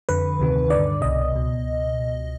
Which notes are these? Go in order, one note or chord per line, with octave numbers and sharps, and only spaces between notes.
F2 D3 B4
D2 C3 D#3
D3 D5
G2
C2 B2 D#5
C#2 B2